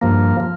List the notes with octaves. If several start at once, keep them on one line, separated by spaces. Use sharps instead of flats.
G2 F3 A#3
F3